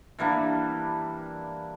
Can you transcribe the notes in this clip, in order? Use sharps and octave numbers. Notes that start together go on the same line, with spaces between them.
E3 G3 A#3 D4